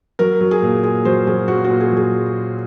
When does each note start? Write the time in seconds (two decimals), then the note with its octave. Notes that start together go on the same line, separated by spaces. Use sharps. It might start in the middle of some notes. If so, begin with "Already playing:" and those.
0.19 F#3 A#4
0.41 F#3
0.51 G#4
0.62 A#2
0.83 A#2 G#4
1.05 F#3 C5
1.27 F#3 G#4
1.48 A#2 F#4
1.64 F#4
1.70 A#2
1.80 G#4
1.92 F#3
1.97 G#4